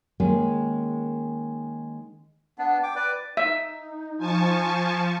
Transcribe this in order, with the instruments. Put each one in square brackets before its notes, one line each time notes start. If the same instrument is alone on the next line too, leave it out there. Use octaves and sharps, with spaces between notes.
[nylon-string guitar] D#3 G#3 A#3 C#4
[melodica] B3 D4
G5 D6
B4 D5 D6
[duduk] D#4 [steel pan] E5
[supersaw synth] F3 [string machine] G#5 A5 C#6